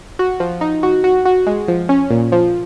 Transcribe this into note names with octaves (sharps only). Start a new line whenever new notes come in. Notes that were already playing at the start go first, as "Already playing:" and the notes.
F#4
F3
D#4
F#4
F#4
F#4
G#3
F3
C#4
A#2
F3